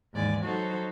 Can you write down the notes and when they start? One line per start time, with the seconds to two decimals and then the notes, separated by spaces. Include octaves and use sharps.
0.13 D#2 G#2 E3 D5 G#5
0.42 F#3 D#4 F#4 A4 C5